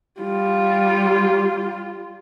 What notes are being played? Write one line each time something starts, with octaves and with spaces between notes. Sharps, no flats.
G3 F4